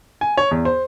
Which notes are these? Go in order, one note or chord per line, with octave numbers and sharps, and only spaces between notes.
G#5
C#5
E2
C5